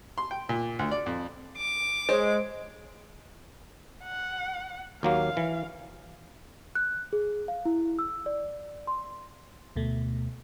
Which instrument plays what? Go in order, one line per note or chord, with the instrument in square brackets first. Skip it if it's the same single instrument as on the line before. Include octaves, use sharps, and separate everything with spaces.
[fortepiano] C6
G5
A#2
D2
D5
F2
[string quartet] D6
[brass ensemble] G#3 [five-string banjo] C5 C#5 D#5
[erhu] F#5
[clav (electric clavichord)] D#2 F#3 A#3 [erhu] F5
[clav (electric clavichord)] E3
[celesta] F#6
G#4
F5
E4
E6
D5
C6
[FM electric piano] D2 B2 A3